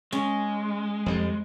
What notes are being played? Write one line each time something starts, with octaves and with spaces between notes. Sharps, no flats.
G#3 C#4
F2 G3